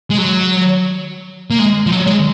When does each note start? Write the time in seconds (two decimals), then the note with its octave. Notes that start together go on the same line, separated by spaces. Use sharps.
0.11 G#3
0.18 F#3
1.50 A#3
1.59 G#3
1.86 F3
1.91 F#3
2.06 G#3